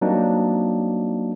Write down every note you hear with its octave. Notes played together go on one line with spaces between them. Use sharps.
F#3 G3 A#3 C4 D4 D#4